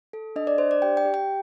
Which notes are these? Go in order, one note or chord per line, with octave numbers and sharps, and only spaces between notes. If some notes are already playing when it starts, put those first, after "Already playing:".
A4
D4 D#5
D5
D4 C5
D5
G4 G5
G5
G4
G5